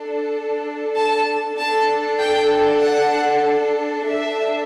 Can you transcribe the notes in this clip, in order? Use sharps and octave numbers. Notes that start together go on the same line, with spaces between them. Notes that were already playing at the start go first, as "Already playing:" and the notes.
Already playing: D4 A4
A5
D4 A4 A5
G5
F#5
D4 A4 E5